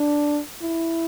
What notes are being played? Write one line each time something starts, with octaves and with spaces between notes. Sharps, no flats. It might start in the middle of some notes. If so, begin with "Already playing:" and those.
Already playing: D4
E4